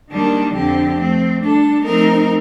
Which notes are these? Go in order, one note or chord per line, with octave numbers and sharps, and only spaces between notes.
D#3 G3 A#3 D4
F2 D3 F3 C4 G4
F3 A3 C4
G3 D4 A4
F3 A3 C4 D#4 A#4